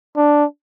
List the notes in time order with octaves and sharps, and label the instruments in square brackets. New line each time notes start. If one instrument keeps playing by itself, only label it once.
[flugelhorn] D4